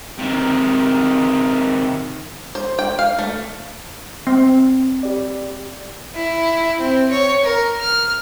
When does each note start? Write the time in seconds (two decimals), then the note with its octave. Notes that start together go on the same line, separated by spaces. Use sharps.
0.19 C3 D#3
2.55 C5
2.79 G5
2.99 F5
3.19 A3
4.27 C4
5.03 G4 D5
6.15 E4
6.80 C4
7.11 C#5
7.44 A#4
7.81 F6